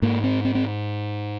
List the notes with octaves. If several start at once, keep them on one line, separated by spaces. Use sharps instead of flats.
G#2 A#3
C4
C4
C4